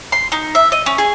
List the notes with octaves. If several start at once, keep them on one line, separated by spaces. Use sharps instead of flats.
C6
D#4
E5
D#5
C#4
G#4